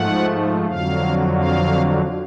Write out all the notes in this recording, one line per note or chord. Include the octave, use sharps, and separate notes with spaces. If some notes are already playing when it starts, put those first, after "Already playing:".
Already playing: G#2 F3 A3 F#5
F2 D3 F#3 F5
F5